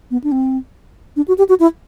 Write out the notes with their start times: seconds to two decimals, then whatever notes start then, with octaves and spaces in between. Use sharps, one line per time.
0.11 B3
0.24 D4
0.32 C4
1.16 D4
1.28 F#4
1.38 G4
1.49 F#4
1.60 E4